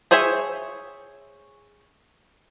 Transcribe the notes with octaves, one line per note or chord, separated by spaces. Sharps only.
G#4 C5 C#5 E5 G#5